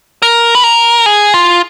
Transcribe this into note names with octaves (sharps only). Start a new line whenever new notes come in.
A#4
B4
A#4
G#4
F4